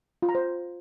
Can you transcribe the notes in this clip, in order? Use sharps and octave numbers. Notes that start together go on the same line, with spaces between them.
F4
A#5
C5